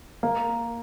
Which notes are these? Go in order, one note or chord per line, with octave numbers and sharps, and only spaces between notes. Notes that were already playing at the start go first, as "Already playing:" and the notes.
A#3